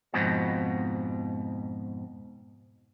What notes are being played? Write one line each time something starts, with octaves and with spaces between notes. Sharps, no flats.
F2 G#2 B2